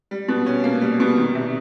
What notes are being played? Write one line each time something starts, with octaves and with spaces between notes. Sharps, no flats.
G3
B2
C#4
A#3
G3
B2
D#3
C3